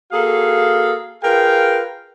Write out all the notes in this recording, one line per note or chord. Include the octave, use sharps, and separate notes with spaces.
A#3 F#4 G#4 A4 F5
F4 G#4 A#4 B4 F5 G5